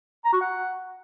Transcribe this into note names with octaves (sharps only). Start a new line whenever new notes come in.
A#5
F#4
F#5